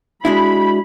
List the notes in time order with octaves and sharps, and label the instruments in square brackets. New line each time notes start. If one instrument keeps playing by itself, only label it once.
[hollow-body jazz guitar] G#3 D4 E4 [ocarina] F#4 [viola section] B5